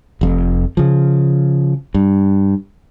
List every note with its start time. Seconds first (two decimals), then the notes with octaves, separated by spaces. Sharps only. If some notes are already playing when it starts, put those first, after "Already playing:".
0.21 F1 F2
0.77 C#3 F3
1.94 G2